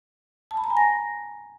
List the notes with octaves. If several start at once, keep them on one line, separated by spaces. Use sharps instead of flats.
A5
B5
A#5
G#5
A#6